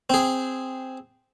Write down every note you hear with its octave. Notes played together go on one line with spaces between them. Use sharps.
C4 G#4